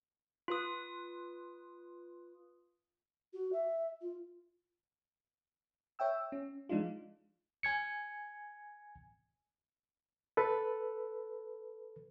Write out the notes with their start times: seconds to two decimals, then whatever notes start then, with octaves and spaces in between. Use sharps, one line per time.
0.48 F4 B4 D#6
3.33 F#4
3.53 E5
4.01 F4
5.99 C#5 E5 G5 E6
6.32 C#4
6.69 F3 G#3 D4 D#4 F4
7.63 G#5 G#6 C#7
10.37 A4 B4